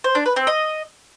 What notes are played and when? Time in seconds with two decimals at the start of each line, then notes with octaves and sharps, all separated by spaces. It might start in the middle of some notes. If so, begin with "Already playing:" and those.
0.04 C5
0.15 D4
0.26 B4
0.36 C4
0.47 D#5